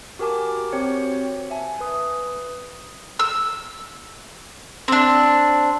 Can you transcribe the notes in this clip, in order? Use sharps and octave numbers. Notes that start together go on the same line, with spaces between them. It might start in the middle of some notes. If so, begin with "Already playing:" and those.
F#4 G4 A#4 G#5 A5 D6
C4 F#4 G4 C5 C#5 C#7
E5 G#5 A5
B4 D#6
E6
C4 D4